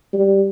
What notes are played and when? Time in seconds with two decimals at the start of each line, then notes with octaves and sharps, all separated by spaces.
0.13 G3